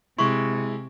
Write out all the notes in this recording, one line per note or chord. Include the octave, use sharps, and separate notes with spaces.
C3 G#3 E4 C6 C#6